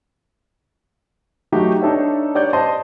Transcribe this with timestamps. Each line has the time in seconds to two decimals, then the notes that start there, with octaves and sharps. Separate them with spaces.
1.52 F#3 A3 D#4 E4 F#4 G4
1.82 D4 D#4 A4 C#5 E5
2.35 G4 C#5 D5 G6
2.53 C5 D#5 A5 C6